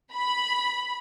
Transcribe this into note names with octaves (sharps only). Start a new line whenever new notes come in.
B5